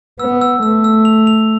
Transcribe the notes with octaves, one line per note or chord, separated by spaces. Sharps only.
B3 E6
E6
A3 E6
E6
F7
F7